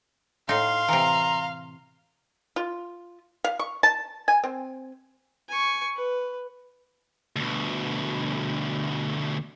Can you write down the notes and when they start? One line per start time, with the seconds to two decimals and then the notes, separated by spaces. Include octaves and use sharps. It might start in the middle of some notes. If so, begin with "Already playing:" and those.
0.49 A2 D#4 F5 C6
0.88 C3 E3 A#5
2.56 F4
3.44 F5
3.59 C#6
3.83 A5
4.28 G#5
4.44 C4
5.49 G#5 C#6
5.96 B4
7.36 D2 B2